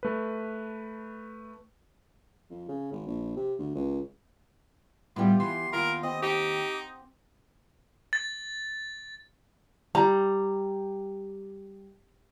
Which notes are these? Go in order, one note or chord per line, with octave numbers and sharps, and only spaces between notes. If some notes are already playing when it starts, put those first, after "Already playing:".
A3 B4
F2
C#3
G#1
A#1
C3
D2
C#2
A2 G3 B3 F4 G4 B4
E3 C6
D#2 F4 A#4
C4 D#5
D#4 G4
A6
G3 A#5